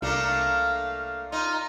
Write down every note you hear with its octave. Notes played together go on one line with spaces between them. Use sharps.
C2 A3 A#3 D4 F5
D#4 F4